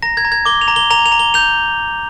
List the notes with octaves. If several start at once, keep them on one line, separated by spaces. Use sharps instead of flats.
A#5 A#6
G#6
A#5
G#6
D6 G7
F7
A#5
G7
A#5 F7
F7
A#5
G7
G6 F7